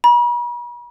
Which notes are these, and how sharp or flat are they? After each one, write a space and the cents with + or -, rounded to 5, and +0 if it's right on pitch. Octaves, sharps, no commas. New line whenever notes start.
B5 -45